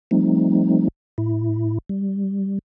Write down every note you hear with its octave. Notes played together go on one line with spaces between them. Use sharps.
F3 G3 A3 C4 D#4
A2 E4
G3